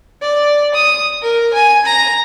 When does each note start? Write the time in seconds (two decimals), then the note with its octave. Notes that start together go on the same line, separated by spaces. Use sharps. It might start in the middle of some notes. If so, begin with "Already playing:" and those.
0.22 D5
0.74 D#6
1.21 A#4
1.53 G#5
1.85 A#5